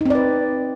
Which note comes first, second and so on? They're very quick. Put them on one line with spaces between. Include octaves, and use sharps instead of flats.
D#4 C4 D5 B4